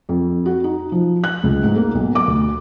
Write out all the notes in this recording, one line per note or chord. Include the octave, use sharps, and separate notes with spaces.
F2
F#4
D#4
F3
F#6
C#2
G#2
A#3
B1
D6
D2